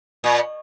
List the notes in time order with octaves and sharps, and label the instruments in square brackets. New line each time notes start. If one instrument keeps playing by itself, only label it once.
[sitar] A#2